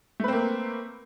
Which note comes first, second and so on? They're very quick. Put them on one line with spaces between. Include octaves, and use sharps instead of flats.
A3 B4 C4 A#3